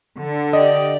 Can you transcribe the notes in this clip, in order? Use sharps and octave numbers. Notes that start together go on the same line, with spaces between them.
D3
G4 D5 D#5